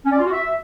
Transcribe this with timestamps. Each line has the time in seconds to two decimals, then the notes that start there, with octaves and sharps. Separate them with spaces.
0.05 C#4
0.12 D5
0.18 F4
0.25 F#4
0.32 E5